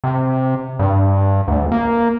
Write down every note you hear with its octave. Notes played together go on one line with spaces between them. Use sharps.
C3
G2
D2
A#3